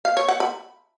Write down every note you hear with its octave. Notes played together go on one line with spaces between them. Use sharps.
F5
C#5
F#5
B5